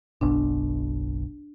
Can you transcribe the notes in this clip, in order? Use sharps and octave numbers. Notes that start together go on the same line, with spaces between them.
F#1 B1 B2 D4